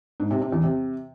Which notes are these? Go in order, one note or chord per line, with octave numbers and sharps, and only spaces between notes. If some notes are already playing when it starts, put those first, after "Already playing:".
G#2
C3
C3
E2
C3